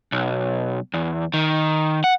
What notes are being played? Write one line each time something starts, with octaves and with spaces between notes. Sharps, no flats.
B1
E2
D#3
F#5